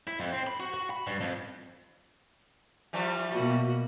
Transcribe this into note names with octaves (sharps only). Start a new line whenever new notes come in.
E4
F2
C4
B5
F#4
F#4
B5
G2
F2
E3 F3 G3
B2 A#3 F#4